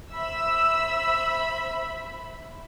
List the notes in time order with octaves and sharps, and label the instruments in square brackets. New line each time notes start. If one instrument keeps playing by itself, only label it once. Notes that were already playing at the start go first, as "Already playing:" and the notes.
[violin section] C5 E5 B5 [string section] E6